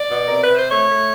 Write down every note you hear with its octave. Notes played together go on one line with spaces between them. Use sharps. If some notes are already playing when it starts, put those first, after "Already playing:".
Already playing: D5
B2
C3 A#4
B4
C3
C5
A3 C#5
A3